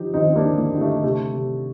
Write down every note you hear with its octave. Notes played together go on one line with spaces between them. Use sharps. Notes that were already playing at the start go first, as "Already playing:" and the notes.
Already playing: D3 F3 D#4 G4
D#2 C4 D#4
C4
A#3 D4
D3
A#3
D3
A3
C3 A3
C3